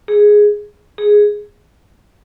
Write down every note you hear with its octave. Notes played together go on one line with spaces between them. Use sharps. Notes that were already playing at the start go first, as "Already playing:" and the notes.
G#4
G#4